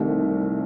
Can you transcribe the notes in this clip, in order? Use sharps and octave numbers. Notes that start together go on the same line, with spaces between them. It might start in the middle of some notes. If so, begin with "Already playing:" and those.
Already playing: C2 C3 D#3 A3